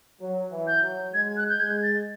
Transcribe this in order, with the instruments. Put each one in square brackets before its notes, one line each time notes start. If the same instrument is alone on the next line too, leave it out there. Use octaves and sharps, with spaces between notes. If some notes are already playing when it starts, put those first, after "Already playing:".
[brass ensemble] F#3
E3
[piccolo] G6
[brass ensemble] F#3
[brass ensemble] G#3 [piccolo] G#6
[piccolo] F#6
G6
[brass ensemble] G#3 [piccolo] G#6
[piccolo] A6